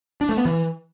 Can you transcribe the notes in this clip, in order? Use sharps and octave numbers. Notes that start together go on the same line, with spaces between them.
D4
A3
B3
E3